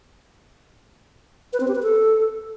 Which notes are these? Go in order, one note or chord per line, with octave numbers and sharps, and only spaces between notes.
B4
C4
G4
B4
A4